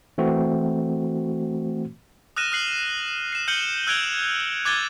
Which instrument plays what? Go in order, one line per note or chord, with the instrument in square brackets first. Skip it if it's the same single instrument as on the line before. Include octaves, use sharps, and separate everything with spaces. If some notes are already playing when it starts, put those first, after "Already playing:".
[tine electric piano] E3 A3 C4 F#4
[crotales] D#6 F6 F#6 A#6 D#7 E7
D#6 F6 F#6 C7 F#7
C7 E7
F6 G6 C#7 D#7 F#7 G7
E6 F#6 G#6 D7 F7 G7
D6 F#6 G#6 A6 D#7 G7